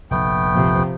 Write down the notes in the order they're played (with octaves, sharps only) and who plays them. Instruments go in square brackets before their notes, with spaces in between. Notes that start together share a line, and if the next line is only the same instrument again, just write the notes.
[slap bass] F1 A#1 [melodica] A3 B3 G5
[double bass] C3 F3